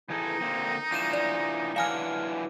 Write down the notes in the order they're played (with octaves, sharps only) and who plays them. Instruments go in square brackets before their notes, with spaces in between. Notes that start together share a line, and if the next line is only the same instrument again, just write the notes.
[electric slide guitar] E3 G#4 A4 [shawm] D#4
[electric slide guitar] D3 A#3 C4
[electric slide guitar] E3 D4 F4 [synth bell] G6 D#7 E7
[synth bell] D5
[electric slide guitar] E3 F#3 D4 [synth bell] F5 G#5 F6